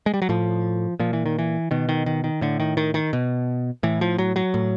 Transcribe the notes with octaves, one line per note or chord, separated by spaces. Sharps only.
G#3
G3
F#3
A2 F3
A#2 F3
E3
D#3
E3
B2 D#3
D#3
D#3
D#3
A2 D3
D#3
D#3
D#3
B2
A2 E3
F3
F#3
F#3
A2